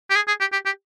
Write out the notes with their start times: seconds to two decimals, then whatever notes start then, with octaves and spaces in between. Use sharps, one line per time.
0.10 G4
0.15 G#4
0.28 G#4
0.40 G4
0.52 G4
0.65 G4